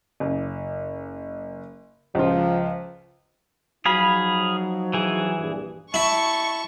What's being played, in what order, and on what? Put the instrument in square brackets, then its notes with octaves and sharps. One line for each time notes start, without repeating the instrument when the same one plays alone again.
[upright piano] F#1
[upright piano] C#2 F4 [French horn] F3
[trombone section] F3 F#3 D#4 [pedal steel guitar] G#4 F5 B5
[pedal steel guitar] E3 G#4
[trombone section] A#1 G2
[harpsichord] E4 [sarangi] A5 [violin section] C#6